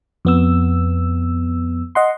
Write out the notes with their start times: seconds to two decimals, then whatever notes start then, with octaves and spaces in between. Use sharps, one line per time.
0.25 F2 B3 E6
1.95 D#5 F#5 C6